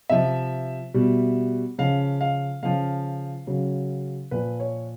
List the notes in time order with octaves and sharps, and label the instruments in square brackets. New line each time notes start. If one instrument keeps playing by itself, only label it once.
[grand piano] C3 F3 E5
B2 G3
C#3 F3 F5
F5
C#3 F3 F5
C#3 F#3
A#2 F3 B4
C#5